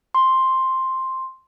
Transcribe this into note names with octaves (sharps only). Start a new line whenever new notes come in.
C6